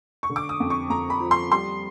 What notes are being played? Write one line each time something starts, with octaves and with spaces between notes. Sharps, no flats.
C#6
D3
D6
D#6
F2
C#6
F2 A#5
B5
F3
C6
G3 C6